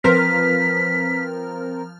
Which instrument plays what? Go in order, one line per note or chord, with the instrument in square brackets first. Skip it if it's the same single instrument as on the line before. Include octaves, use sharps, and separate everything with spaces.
[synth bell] F3 F6 [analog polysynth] C4 A#4 [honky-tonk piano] B4 [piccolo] B6